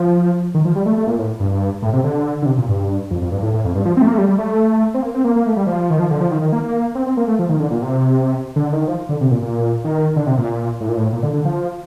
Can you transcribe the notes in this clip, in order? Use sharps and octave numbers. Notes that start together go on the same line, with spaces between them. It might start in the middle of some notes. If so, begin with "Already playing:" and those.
Already playing: F3
D#3
F3
G3
A3
A3
A#2
A2
G2
A2
C3
D3
D3
C3
A#2
G2
F2
F2
G2
A2
A2
F2
G2
F3
C4
A3
A#3
A3
G3
G3
A3
C4
A#3
C4
A#3
A#3
A3
G3
F3
D#3
F3
D3
F3
D#3
D#3
A#3
A#3
C4
C4
A#3
A3
F3
D#3
D3
A#2
C3
D3
D#3
F3
D3
C3
A#2
A#2
D#3
D3
C3
A#2
A2
A#2
A2
A#2
D3
D3
F3